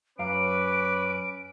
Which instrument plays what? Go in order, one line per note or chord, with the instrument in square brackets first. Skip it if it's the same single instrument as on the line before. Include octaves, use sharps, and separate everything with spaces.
[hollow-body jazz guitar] F#2 F5 A#5 [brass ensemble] C#4 B4 [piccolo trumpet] D6 [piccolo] D7